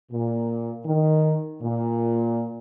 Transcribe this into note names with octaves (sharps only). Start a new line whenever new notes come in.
A#2
D#3
A#2